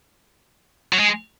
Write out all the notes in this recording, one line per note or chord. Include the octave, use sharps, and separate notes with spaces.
F#3
G#3